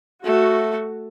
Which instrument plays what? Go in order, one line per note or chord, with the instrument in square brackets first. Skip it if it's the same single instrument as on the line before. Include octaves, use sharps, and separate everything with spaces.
[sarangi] A3 [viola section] F#4